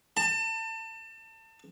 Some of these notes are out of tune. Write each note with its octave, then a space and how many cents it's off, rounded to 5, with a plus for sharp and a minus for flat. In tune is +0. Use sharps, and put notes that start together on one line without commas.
A5 +30